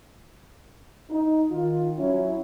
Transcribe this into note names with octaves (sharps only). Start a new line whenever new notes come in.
D#4
D#3 F4
F#3 C#4 E4